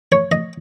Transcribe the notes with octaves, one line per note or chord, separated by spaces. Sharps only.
C#5
D#5